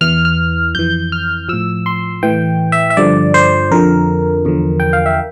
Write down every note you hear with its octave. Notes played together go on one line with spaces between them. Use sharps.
E2 E3 F6
F6
F2 E3 G6
F6
A2 F3 E6
C6
A2 E3 G5
E5
E5
G2 D3 F3 D5
C5
F2 D3 F3 A#4
E2 D3 F3
G5
F5
E5